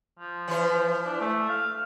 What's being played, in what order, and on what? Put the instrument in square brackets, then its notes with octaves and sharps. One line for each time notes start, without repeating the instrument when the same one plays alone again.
[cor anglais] F3
[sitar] E3 C5
[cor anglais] D4
A3
F5